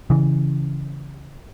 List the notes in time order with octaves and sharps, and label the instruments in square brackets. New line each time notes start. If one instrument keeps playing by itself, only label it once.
[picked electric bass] C#3 E3